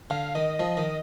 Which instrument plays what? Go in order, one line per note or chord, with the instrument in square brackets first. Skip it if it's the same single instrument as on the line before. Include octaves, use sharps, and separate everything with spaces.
[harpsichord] D3 [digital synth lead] F5
[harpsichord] D#3 [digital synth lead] D#5
[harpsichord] F3 [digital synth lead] D#5
[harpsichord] D#3